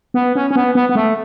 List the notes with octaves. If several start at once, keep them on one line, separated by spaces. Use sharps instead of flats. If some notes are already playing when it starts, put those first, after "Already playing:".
B3
C#4
C#4
B3
B3
B3
A3